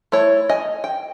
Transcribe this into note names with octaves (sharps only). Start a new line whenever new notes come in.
A3 E4 C#5
D#5 G#5
G5